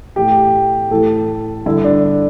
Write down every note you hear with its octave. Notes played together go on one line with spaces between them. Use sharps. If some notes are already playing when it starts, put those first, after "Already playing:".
A2 E3 G4
A2 E3 A4
G2 D3 E4
D4